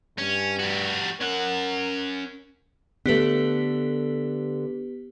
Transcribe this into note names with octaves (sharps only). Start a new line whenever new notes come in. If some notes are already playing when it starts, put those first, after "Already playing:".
G2 C#4
G3 F#4
C#4 A#4 F#5
D3 A3 B3 G4 B4